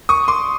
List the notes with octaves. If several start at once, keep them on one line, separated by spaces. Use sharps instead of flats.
C#6 D#6
C6 D6